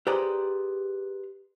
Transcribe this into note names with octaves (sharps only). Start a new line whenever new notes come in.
G4 G#4 B4 C5 D5 A#5